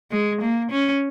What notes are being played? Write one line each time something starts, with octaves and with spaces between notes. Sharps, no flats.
G#3
A#3
C#4